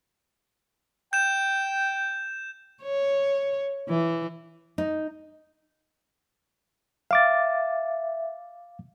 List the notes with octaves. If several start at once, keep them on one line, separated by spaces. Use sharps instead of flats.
G5 G6 E7
C#5
E3
D#4
E5 F5 D6 A6